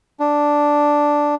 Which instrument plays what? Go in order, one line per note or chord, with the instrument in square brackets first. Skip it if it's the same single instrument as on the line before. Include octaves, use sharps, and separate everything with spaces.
[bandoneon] D4